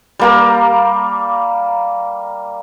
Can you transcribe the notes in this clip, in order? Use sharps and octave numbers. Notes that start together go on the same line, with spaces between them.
G3 A#3 A#5